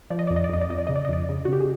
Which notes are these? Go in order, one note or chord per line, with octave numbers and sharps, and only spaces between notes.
F3 D5
D#5
F2 D5
D#5
D5
F2 D#5
D5
F2 D#5
D5
C#3 D#5
D5
D#5
F2 D5
C#3
F#4
C#3 G4
G#4